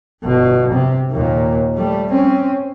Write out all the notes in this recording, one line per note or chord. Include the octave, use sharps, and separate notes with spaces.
G1 B2
C3
D#2 A#2
G3 A3
C4 C#4